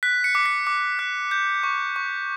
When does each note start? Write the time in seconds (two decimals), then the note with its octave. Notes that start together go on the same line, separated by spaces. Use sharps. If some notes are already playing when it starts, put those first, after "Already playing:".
0.03 F#6 B6
0.24 C#7
0.35 D6
0.46 B6
0.67 D6
0.99 F#6
1.31 G6
1.63 C#6
1.96 C#6